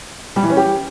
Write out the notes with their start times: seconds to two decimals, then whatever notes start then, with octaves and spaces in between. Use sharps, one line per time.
0.36 G3
0.43 E3
0.50 C#4
0.57 G4